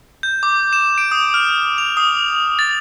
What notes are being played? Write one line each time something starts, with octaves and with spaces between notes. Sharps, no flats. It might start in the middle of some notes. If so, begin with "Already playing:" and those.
G6
D6
E7
D7
D#6
F6
F7
D#6
A6